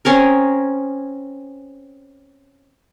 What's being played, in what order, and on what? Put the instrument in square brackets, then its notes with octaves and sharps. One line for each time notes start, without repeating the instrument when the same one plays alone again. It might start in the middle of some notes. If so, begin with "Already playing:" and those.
[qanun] C4 C#4 G#4 A#4